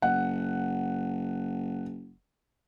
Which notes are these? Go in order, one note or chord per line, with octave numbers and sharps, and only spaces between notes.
F#1 F#5